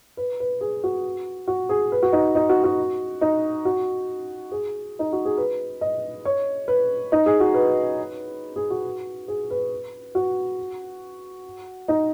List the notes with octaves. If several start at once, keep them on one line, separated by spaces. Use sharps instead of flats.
B4
B4
G#4
F#4
F#4
G#4
B4
F#4
D#4
D#4
F#4
F#4
D#4
F#4
G#4
D#4
F#4
G#4
B4
D#5
C#5
B4
D#4
G#4
F#4
B4
G#4
F#4
G#4
B4
F#4
D#4